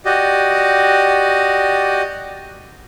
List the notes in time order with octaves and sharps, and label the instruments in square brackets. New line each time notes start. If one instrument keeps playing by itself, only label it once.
[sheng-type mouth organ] F#4 G4 D5 D#5